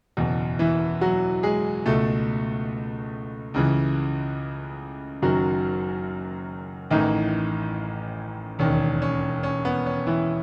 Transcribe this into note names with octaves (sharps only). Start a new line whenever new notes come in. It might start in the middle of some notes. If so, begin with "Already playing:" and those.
F#1 E2 B2
E3 E4
F#3 F#4
G#3 G#4
C#2 B2 A3 A4
C#2 C#3 E3
F#1 F#2 D#3 F#3 F#4
A1 A2 D#3 E3 D#4
E1 D#2 D#3 C#4
C#4
C#4
B3
C#4
E3 E4